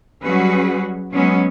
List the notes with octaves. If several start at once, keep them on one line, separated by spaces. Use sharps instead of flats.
F#3 G3 C#4 F#4 G#4 B4
F#3 G#3 B3 C#4